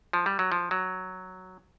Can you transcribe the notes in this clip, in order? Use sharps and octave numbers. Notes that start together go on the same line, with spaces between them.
F3
G3
F#3
F3
F#3